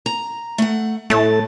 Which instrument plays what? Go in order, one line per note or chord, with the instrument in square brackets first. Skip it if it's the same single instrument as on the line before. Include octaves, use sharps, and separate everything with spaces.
[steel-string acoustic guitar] A#5
A3 F#5
[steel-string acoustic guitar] A2 A5 [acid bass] A3